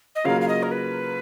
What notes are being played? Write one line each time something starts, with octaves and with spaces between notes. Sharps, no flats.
D#5
C#3 F#3 A#3 C#4 F4 F5
F5
D#5
A#4
B4